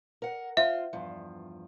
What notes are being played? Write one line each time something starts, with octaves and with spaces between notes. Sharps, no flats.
A#4 F#5
F4 C5 E5
E2 G2 F3